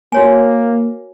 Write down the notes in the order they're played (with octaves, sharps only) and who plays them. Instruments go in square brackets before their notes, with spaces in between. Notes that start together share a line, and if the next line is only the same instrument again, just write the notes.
[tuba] A#3 [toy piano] F#4 C#5 G#5